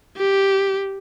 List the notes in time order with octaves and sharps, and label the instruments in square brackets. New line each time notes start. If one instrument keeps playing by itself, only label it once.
[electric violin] G4